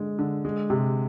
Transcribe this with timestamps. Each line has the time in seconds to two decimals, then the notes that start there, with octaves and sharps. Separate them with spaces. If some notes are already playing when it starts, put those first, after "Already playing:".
Already playing: D3 G#3
0.19 D3
0.45 G#3
0.70 C3